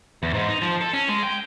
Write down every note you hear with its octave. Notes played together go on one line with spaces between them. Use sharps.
E2
G#2
D#4
F3
A4
C#4
G#3
G5